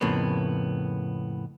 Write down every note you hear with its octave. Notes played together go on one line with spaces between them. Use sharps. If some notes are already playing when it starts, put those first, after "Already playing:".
F2 A2 C#3 A#3 B3